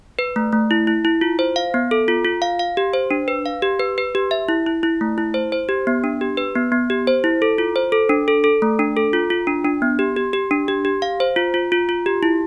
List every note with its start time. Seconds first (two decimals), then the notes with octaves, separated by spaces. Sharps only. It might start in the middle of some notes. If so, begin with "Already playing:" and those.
0.19 B4
0.36 A3
0.52 A3
0.71 E4
0.87 E4
1.05 E4
1.21 F4
1.39 C5
1.56 F5
1.74 B3
1.91 A4
2.08 F4
2.25 F4
2.42 F5
2.59 F5
2.77 G4
2.93 C5
3.11 D4
3.28 B4
3.46 F5
3.62 G4
3.80 B4
3.98 B4
4.15 G4
4.31 E5
4.48 E4
4.66 E4
4.83 E4
5.01 A3
5.18 E4
5.34 C5
5.52 C5
5.69 G4
5.87 B3
6.04 D4
6.21 G4
6.37 B4
6.55 B3
6.72 B3
6.90 G4
7.07 C5
7.24 E4
7.42 A4
7.58 F4
7.76 C5
7.92 A4
8.09 D4
8.28 A4
8.44 A4
8.62 A3
8.79 D4
8.97 A4
9.13 F4
9.30 F4
9.47 D4
9.65 D4
9.82 B3
9.99 G4
10.16 G4
10.33 G4
10.51 D4
10.68 G4
10.85 G4
11.02 F5
11.20 C5
11.36 F4
11.54 F4
11.72 F4
11.89 F4
12.06 G4
12.23 E4